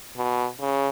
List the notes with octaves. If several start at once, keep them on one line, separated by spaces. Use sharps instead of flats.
B2
C#3